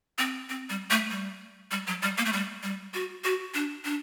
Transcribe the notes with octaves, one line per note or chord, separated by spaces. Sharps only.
C4
C4
G3
A3
G3
G3
F#3
G3
A#3
A3
G3
G3
F#4
F#4
D4
D4